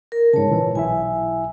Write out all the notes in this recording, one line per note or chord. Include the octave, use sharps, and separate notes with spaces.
A#4
G#2 C#3 C#5 A5
A#2 E3
B1 E4 E5 G#5